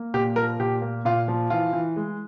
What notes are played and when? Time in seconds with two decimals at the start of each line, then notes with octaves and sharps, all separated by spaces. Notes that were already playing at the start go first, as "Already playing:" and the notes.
Already playing: A#3
0.14 A#2 G4
0.36 F3 A#4
0.59 A#2 G4
0.82 A#3
1.05 A#2 F4
1.28 F3
1.50 E3 F4
1.73 E3
1.96 G#3